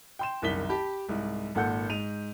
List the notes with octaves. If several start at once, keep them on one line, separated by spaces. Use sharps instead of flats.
G5 C6 E7
F#1 C2 D#3 B6 G7
G4 A5 B5
C2 G#2
G#1 A#2 A4 F#5 G6
G#2 D#7 F7